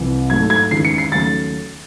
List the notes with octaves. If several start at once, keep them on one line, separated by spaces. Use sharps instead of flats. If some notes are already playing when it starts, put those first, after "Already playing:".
Already playing: C2 C3 E3
G#2 F#3 A3 G#6
G#6
D#2 C#3 E3 G#3 C7
C#7
C7
D#2 C#3 F#3 A3 A6